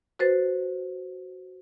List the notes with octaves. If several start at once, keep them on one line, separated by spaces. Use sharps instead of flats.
F#4 B4 C5 A6